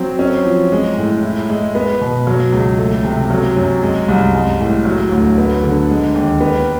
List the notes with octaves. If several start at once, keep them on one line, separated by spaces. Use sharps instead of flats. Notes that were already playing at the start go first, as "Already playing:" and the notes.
Already playing: F#3 C4
C#4
F3
G#3
A2
E4
G#3
B3
B2
F#3
C#2
A3
C3
F#3
F#2
G#3
C2
G#3
A2
F#3
D2
B3
D3
G#3
D#2
B3